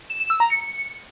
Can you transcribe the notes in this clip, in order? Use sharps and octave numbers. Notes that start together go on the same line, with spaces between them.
E7
E7
E6
A#5
C#7